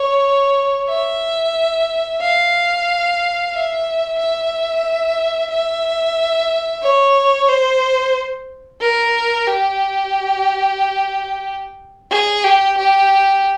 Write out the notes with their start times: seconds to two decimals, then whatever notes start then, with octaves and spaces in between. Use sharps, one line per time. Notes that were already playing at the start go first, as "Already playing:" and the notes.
Already playing: C#5
0.88 E5
2.21 F5
3.54 E5
4.19 E5
5.51 E5
6.83 C#5
7.49 C5
8.81 A#4
9.47 G4
12.11 G#4
12.44 G4
12.77 G4